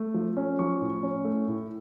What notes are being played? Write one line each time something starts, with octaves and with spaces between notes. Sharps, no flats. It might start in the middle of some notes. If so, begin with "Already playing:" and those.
Already playing: A3
F3
C#4
F3 C#6
A2
C#4
A3
A2